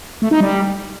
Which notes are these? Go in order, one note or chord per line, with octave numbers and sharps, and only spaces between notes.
A3
D#4
G3